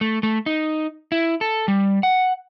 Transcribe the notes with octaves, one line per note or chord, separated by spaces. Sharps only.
A3
A3
D#4
E4
A4
G3
F#5